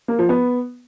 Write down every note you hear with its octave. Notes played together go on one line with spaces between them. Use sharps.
A#3
F3
B3